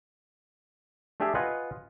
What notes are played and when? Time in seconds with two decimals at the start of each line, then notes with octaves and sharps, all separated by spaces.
1.20 A3 D4 G4 G#4 E5
1.35 F4 B4 D#5 F#5 G#5